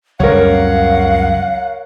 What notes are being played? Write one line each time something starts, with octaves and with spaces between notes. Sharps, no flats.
C#2 F#2 G3 A#4 C#5 F5 F#5